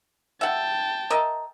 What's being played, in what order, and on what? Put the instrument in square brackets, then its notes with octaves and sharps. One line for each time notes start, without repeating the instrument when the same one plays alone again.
[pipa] E5 F#5 [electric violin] G5 A5
[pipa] A#4 D#5 E5